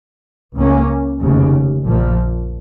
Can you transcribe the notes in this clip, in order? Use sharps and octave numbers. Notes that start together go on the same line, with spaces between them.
C#2 C#3 A#3 C#4
F1 D#2 C#3
A#1 A#2 F3